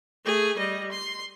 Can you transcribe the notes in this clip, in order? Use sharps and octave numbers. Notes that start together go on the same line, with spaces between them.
A3 G#4
G3 D#5
C6